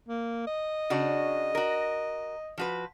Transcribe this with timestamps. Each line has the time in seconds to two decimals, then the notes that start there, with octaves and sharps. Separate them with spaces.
0.09 A#3
0.47 D#5
0.90 C#3 D4 F#4
1.55 F#4 A#4
2.58 F3 F#4 B4